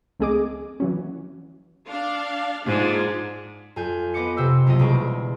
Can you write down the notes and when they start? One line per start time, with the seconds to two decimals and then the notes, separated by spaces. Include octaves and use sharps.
0.19 C#2 A3 C4 G#4 D#5 D6
0.80 E3 F#3 C#4
1.90 D4 F5
2.67 G#2 D4 F4 G#4
3.76 F2 F4 G#5 G6
4.14 B3 D#5 D6 C#7
4.37 C3 B3 C5 E6
4.66 F#1 C2 F4 D#5
4.79 E1 G3 G#3 D5 C#6